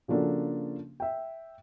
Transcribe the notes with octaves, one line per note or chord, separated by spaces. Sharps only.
C#3 F3 A#3 D4 F#4 A4
E5 G5